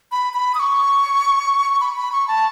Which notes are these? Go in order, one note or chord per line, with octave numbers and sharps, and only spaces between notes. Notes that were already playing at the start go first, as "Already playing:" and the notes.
B5
B5
D#6
C#6
B5
B5
C#6
A5